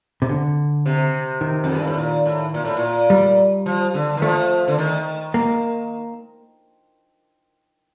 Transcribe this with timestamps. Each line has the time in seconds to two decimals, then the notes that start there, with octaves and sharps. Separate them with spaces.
0.22 C3
0.29 D3
0.86 C3
1.41 D#3
1.64 F2
1.75 G2
1.87 A2
1.98 A#2
2.26 A2
2.54 A#2
2.65 A2
2.77 A#2
3.10 G3
3.66 F3
3.94 D3
4.17 D#3
4.22 F3 A3
4.68 D3
4.78 D#3
5.34 A#3